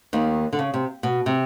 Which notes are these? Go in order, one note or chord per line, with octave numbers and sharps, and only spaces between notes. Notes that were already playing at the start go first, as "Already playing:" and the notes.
D#2 D#3
D3
C#3
C3
B2
C3